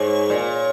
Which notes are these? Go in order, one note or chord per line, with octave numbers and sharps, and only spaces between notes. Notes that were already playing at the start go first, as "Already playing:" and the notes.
Already playing: G#2 C#5
A#2